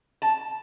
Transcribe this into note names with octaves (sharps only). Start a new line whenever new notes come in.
A5